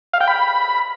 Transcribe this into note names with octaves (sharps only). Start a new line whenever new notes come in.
F5
G5
B5